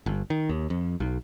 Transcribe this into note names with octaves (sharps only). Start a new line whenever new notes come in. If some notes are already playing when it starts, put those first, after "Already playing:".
G1
D#3
D#2
F2
B1